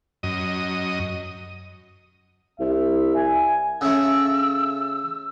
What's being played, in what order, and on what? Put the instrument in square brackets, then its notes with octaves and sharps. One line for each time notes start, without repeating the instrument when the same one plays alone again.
[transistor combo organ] F#2 D#5
[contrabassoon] C2 [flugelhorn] E5
[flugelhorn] G#5
[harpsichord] C#3 A3 [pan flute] E6